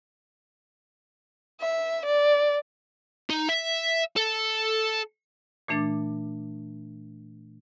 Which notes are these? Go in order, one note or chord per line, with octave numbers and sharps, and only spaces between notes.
E5
D5
D#4
E5
A4
A#2 E3 A3 D4 D6 A6